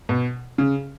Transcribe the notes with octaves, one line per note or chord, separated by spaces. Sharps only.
B2
C#3